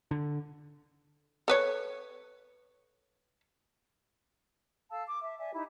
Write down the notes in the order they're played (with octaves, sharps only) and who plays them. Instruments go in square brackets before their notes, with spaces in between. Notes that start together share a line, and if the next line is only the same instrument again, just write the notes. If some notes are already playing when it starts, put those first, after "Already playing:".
[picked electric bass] D3
[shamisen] A4 B4 C#5
[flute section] A4 F5 A5 E6
D6
E5
D5 E5 G#5
D#4 E4 G4